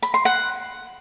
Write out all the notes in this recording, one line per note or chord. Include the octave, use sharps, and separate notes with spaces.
B5
C6
F#5